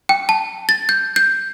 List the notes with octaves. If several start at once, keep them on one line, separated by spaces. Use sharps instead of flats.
G5
A5
A6
G6
G6